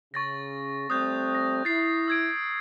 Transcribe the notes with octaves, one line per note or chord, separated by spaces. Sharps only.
C#3 C#6 A6 A#6
G3 A3 C4 D#6 F#6 G6
A#6
E4 A6 C7
E6 G#6 D7